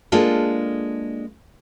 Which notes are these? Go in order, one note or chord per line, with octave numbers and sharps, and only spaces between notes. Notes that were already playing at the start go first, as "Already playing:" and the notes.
G#3 A#3 D4 F4 A4